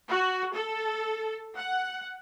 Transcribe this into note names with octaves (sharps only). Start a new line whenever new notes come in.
F#4
A4
F#5